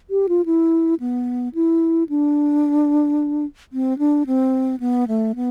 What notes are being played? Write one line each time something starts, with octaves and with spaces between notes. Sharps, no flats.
G4
F4
E4
B3
E4
D4
C4
D4
C4
B3
A3
B3